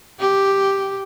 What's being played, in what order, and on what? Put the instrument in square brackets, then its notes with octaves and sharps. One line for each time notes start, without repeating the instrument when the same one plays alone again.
[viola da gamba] G4